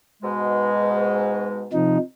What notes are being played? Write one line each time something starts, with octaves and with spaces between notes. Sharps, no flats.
G#2 B2 G#3
C3 F3 D#4